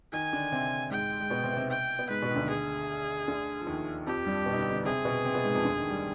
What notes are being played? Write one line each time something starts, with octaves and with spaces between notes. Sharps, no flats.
D#3 D#4 G#5
D3 D4
C3 C4
G#2 G#3 G5
G#3
B2 B3
C3 C4
B3
C3 C4
G5
B3
G#2 G#3 B4
B2 B3
D#3
D2 D3
G#4
D2 D3
F3
D#2 D#3
F2 F3 G4
G2 G3
B2 B3
D#4
D3 D4
D3 D4
C3 C4 G#4
B2 B3
C3 C4
B2 B3
G#2 G#3
F2 F3
D2 D3
D#2 D#3
G3